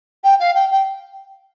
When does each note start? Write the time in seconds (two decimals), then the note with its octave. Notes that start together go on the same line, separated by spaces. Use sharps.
0.24 G5
0.39 F5
0.54 G5
0.71 G5